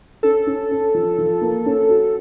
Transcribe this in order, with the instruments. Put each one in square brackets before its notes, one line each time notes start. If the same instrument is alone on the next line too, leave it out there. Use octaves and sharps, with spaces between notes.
[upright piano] C#4 [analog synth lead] A4
[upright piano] C#4
C#4
F3
F3
A#3
C#4
F#4